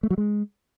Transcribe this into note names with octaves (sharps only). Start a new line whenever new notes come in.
A3
F#3
G#3